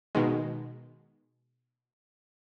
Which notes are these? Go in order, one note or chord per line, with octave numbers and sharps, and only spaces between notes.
B2 D#3 G#3